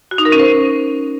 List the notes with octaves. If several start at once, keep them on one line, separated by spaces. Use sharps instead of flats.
F#4
D#4
A#4
C#4
C5